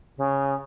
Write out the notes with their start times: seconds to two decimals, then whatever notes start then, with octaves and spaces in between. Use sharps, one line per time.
0.17 C#3